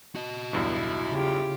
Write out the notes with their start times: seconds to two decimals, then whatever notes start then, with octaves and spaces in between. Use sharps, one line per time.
0.15 F#4 D#5
0.53 B1 E2 G2 E4
1.10 C#3 F4 G4